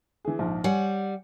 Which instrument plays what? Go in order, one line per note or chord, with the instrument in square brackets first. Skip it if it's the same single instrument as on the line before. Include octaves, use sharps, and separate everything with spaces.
[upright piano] E3 G#4
A#1 G#2 F3
[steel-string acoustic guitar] G3 F#5 [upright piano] C#5 G#5